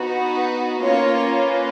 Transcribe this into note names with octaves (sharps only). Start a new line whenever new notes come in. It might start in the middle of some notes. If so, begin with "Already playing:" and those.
Already playing: B3 D#4 F#4
B4
A#3 C#4 F4 A#4 C#5
B4